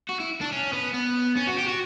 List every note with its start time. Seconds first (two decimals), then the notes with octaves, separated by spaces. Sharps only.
0.09 F#4
0.20 E4
0.41 D4
0.52 C#4
0.73 B3
0.94 B3
1.37 C#4
1.47 F#4
1.58 G4
1.68 F#4